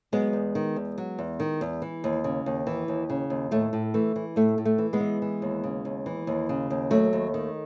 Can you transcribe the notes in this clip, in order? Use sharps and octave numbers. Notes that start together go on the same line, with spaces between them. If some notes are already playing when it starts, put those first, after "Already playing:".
F#3 G#3 B3
E2
D#3
E2
F#3
E2
D#3
E2
E3
D#2
C#3
D#2
E3
D#2
C#3
D#2
A2 A3
A2
E3 A3
E3
A2 A3
A2
A3
E3
G#3 B3
E3
E3
D#2
C#3
D#2
E3
D#2
C#3
D#2
F#3 A3
D#2
D#3